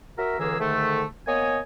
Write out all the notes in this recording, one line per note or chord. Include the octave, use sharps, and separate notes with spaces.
F#4 A#4 E5
C#2 D3 E3 A#3 G#4 E6
G#2 D3 D#3 A3
A#3 B3 C#5 D#5 G#5